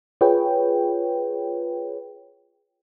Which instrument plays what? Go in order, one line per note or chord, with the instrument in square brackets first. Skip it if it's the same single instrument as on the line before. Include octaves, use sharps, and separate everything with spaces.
[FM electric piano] F4 G#4 B4 C#5 G5